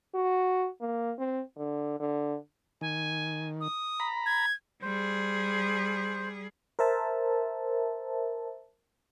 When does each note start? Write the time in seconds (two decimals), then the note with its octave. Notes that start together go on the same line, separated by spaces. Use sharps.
0.15 F#4
0.81 A#3
1.19 C4
1.57 D3
2.00 D3
2.81 D#3 G#5
3.61 D#6
4.00 A#5 B5
4.26 G#6
4.82 G3 G#4 C5
6.79 A#4 C5 E5 A5